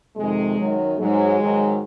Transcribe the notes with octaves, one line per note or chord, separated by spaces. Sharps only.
F2 C3 D#3 G#3
F#2 D#3 F#3
G#2 F#3 G#3
G#2 D#3 F#3